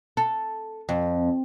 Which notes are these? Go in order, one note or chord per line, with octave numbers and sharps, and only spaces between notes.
A4
F2